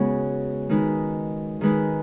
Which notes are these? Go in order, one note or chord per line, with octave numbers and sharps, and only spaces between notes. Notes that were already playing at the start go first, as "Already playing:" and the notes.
Already playing: C#3 G#3 B3 F#4
D#3 G#3 D#4 B4
D#3 G#3 D#4 B4